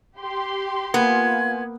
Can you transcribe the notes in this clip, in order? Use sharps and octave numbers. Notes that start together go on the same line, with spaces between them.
G4 C6
A#3 B3 F4 G#5 G#6